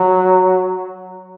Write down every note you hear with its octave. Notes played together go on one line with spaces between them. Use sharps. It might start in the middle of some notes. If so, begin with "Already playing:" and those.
Already playing: F#3